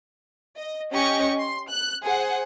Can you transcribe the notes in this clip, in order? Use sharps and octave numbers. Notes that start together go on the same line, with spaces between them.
D#5
C#4 G4 D#5 C#6
C6
F#6
G#4 C5 F#5